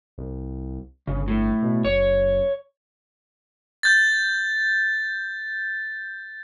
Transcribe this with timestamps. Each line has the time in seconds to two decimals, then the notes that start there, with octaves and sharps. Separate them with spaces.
0.18 C2
1.07 G1 C#3
1.28 A2
1.62 B2
1.85 F#1 C#5
3.83 G6 A6